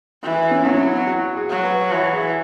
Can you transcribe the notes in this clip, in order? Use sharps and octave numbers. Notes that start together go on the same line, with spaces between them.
E3 F#4
C#4
E4
F#3 C#4
E4
F#4
G#4
F#3
B4
E3 C#5
G#4